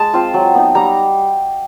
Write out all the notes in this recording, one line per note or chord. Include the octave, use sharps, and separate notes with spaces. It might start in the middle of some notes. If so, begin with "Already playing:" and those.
Already playing: G#3 A5
C4 F4
F#3
B3 D#4
G3 A#5